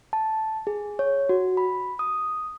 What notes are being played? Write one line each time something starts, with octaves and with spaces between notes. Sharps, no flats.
A5
G#4
C#5
F#4
B5
D#6